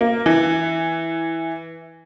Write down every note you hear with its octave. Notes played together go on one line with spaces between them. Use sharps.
A#3
E3